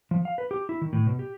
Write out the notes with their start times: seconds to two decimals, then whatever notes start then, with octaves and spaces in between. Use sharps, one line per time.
0.11 F3
0.25 F5
0.38 B4
0.51 G4
0.69 E4
0.81 D#3
0.93 A2
1.06 B2
1.19 G4